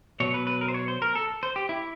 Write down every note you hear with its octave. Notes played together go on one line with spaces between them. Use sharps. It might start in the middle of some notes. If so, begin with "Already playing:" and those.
B2 F#3 C#5
B4
B4
A#4
C5
C#5
C5
A#4
A4
C5
G4
E4